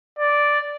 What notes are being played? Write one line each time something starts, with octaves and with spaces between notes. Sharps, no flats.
D5